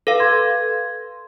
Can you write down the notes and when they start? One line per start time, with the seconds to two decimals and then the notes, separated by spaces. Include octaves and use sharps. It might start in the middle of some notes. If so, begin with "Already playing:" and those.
0.07 A4 B4 F5
0.20 C6 G#6